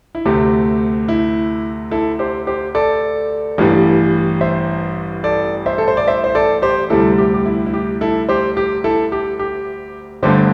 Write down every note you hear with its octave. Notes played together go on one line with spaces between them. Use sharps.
E4
D2 C3 A3 G4
E4
E4 A4
G4 C5
G4 C5
A4 D5
A1 G2 E3 G3
C5 E5
A4 D5
C5 E5
A4
C5
D5
C5 E5
C5
A4 D5
G4 C5
D2 C3 G3 E4 A4
G4
G4
E4
E4
G4
E4 A4
G4 C5
G4
E4 A4
G4
G4
G1 G2 D3 A3 G4 C5